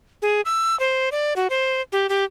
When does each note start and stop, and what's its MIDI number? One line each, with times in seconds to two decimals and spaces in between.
0.22 0.41 68
0.45 0.78 88
0.80 1.09 72
1.12 1.34 74
1.36 1.47 66
1.50 1.81 72
1.92 2.07 67
2.09 2.24 67